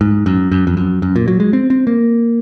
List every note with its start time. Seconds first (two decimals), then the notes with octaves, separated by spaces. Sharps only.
0.01 G#2
0.26 F#2
0.52 F#2
0.67 F2
0.77 F#2
1.02 F#2
1.16 A#2
1.28 F#3
1.40 G#3
1.53 C4
1.70 C4
1.87 A#3